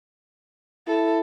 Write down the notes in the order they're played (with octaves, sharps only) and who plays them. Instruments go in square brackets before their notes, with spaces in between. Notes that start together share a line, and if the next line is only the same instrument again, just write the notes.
[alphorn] E4 [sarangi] A4